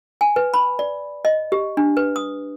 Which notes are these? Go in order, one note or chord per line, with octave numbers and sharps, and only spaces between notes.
G#5
B4
B5
D5
D#5
G4
D4
B4
D#6